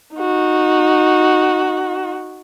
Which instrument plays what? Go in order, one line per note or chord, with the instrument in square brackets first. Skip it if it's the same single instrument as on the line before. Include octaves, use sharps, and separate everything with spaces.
[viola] D#4 F#4